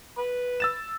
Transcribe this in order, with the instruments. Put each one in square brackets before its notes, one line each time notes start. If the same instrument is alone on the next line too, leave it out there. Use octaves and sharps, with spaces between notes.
[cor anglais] B4
[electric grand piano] E6 A6 E7